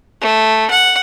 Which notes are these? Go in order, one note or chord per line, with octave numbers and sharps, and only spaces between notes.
A3
F#5